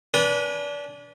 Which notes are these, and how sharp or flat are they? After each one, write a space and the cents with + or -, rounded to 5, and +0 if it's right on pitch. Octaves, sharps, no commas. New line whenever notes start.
D4 -25 B4 -20 G#5 +0